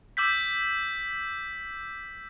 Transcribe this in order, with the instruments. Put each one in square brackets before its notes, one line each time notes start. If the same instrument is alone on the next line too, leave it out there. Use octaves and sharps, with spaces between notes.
[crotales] D6 E6 G6 B6